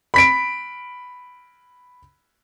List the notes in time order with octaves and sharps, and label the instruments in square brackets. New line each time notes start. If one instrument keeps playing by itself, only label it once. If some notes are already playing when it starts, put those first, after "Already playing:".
[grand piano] B5 B6 D7